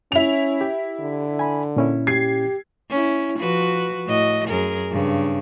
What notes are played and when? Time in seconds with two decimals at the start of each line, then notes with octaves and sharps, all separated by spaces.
0.12 C#4 E4 F7
0.61 G4
1.00 D3
1.39 G#5 B5
1.76 A#2 C#4 E4
2.07 G4 G#6 C7
2.90 C#4 E4
3.39 F3 F#4 B4
4.06 A2 F#4 D#5
4.48 F#2 G#4 A#4
4.91 G2 C#3